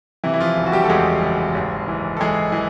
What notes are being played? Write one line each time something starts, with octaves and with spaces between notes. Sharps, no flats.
C3 E3 E4
E4
F3 F4
F#1
F#4
G3 G4
A4
E2 G#3 G#4
F#1
G#1
E3
A4
E3 G#3 G#4
E3